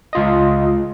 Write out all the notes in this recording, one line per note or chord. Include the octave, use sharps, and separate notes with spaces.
C#2 F4 D#5